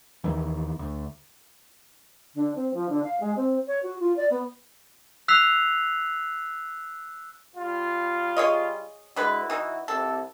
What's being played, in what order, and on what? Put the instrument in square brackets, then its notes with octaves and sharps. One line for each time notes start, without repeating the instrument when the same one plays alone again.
[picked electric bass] D#2 D#3 E3
D2
[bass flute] D3
C4
F3
D3
F5
G#3
C4
C#5
F#4
F4
D5
B3
[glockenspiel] E6 F#6 B6 C7 F7
[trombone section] G3 F4
[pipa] G#4 C#5 D#5
[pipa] D3 G#3 B4 [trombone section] E4 F#4
[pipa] E3 D#4
[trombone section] C2 F2 C3 [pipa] A4